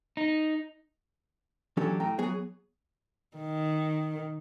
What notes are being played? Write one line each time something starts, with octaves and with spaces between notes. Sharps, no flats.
D#4
E3 F#3 C#4 D4 G4 A4
A2 G5 A#5
F#3 B3 G#4 C#5
D#3